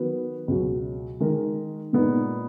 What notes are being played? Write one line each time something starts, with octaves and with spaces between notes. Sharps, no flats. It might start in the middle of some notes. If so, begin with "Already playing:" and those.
Already playing: D#3 F#3 B3 F#4 B4
C#2 B2 F#3
D#3 G#3 D#4 A#4
A#2 G#3 B3 D#4